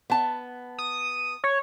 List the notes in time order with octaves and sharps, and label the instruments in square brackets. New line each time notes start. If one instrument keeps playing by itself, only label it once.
[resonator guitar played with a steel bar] B3 A5
[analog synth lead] D#6
C#5